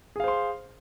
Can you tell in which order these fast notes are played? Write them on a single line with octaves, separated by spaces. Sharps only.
G#4 F5 C5 C6